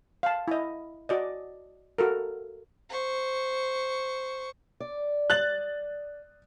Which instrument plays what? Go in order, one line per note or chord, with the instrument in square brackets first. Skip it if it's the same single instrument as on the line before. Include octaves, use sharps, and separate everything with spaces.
[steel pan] F5 A5
E4 D#5
F#4 D5 D#5
F#4 A4 A#4
[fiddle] C5 C#6
[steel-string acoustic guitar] D5
[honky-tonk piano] F#6 A6 F#7